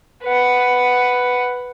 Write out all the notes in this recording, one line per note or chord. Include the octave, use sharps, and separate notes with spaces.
B4 F#5